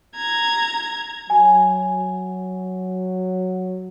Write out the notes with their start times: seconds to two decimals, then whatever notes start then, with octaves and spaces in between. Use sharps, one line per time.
0.16 A#5 G#6
1.30 F#3 G#5